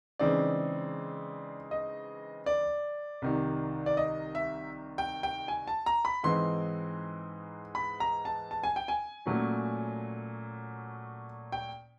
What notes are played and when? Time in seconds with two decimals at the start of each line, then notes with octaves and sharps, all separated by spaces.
0.19 C#3 E3 G#3 C4 D#4 D5
1.71 D#5
2.46 D5
3.22 C2 C3 D#3
3.86 D5
3.97 D#5
4.35 E5
4.98 G5
5.23 G5
5.48 G#5
5.68 A5
5.86 A#5
6.05 B5
6.23 G#2 E3 G#3 C4 D#4 C6
7.75 B5
8.00 A#5
8.25 A5
8.51 A5
8.64 G#5
8.76 G5
8.88 G#5
9.26 A#2 F#3 A3 C#4
11.52 G5